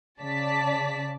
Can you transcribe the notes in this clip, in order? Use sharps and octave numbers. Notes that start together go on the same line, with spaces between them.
C#3 D5 A5 B6